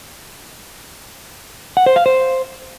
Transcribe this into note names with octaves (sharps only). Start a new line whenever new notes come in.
F#5
C5
F5
C5